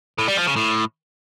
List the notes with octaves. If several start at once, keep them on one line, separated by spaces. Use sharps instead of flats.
A2
G3
F3
C#3
A2